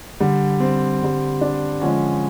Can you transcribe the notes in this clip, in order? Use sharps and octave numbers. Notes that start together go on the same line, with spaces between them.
D3 G3
C4
D3 G3
D4
D3 F3 G#3 C#4